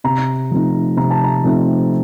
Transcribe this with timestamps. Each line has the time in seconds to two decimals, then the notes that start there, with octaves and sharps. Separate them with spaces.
0.04 C3 A#5
0.51 F3 A3 C4 D#4
0.97 C3 A#5
1.11 A5
1.24 A#5
1.43 F3 A3 C4 D#4